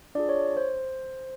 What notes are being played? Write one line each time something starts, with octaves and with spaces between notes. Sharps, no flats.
D4 F4 G#4 D5
C#5
C5